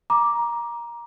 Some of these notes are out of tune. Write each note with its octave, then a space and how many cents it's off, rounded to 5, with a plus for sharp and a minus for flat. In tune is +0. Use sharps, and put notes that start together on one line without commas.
A#5 +15 D6 +0